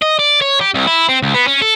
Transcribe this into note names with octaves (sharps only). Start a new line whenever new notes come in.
D#5
D5
C#5
G4
C2
E4
C4
C#2
B3
C#4
A4